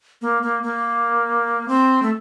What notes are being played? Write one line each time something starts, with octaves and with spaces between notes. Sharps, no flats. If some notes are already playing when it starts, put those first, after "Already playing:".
A#3
A#3
A#3
C4
A3